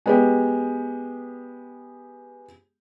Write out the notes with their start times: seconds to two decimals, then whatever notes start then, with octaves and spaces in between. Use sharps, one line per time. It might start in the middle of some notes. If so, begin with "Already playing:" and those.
0.06 G#3 B3 G4